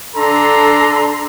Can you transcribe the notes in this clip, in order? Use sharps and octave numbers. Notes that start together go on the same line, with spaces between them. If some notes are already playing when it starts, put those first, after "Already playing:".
D3 D4 A4 A#5 C6